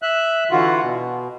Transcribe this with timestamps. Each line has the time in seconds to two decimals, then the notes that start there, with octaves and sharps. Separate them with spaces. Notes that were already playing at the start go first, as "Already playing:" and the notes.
0.02 E5 F#6
0.51 D3 E3 F4 F#4
0.82 B2